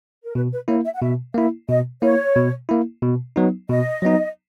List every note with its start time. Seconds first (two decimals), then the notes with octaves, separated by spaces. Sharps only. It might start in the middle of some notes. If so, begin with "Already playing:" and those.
0.24 A#4
0.35 B2 B4
0.52 B4
0.68 A#3 E4 C#5
0.85 E5
0.95 F#5
1.01 B2 E5
1.35 A#3 E4 E5
1.69 B2 D#5
2.02 A#3 E4 C#5
2.36 B2
2.69 A#3 E4
3.02 B2
3.36 F#3 B3 D#4
3.69 B2 D#5
4.02 F#3 B3 D#4